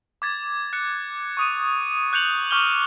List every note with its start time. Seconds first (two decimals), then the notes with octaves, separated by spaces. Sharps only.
0.22 D6 G#6 A6
0.73 F#6 C#7
1.37 C#6 D#6 D#7
2.13 F#6 G6 C#7 F7 F#7
2.51 C#6 D6 F6 G6 G7